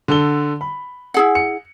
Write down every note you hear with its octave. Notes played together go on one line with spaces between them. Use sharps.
D3 A4 G7
B5
E4 G#4 F#5
C#7